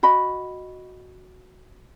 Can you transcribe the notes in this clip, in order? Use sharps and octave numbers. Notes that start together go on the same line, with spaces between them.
F#4 D#5 B5